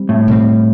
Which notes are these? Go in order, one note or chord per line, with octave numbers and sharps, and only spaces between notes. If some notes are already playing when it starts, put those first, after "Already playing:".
Already playing: G3 C4
A2
B2 G3 C4